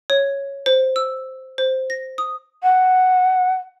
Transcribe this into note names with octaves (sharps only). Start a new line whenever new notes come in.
C#5
C5
E6
C5
A#6
D#6
F#5